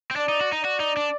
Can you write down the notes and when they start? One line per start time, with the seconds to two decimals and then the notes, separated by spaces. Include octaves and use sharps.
0.11 C4
0.16 D4 D5
0.29 D#4
0.41 F#4
0.52 D#4
0.64 F#4 D5
0.80 D#4
0.97 D4